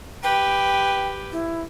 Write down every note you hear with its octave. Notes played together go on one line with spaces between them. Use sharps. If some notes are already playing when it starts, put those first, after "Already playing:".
G4 B4 G5
E4